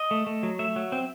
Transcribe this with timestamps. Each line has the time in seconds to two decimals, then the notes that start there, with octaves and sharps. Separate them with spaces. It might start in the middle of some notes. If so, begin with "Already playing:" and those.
Already playing: D#5
0.11 A3
0.27 A3
0.43 F#3
0.59 A3 E5
0.76 F#3
0.92 C4